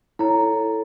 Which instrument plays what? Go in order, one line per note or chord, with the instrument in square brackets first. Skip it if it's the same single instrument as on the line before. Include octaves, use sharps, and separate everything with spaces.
[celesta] E4 A#5 [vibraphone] A4 C#5